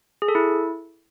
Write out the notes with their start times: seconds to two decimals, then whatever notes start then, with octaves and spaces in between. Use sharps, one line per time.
0.22 G#4
0.28 A4
0.35 E4